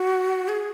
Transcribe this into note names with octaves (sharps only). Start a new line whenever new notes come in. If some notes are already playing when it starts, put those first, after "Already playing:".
Already playing: F#4
G#4